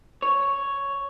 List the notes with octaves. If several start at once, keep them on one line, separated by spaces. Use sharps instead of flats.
C#5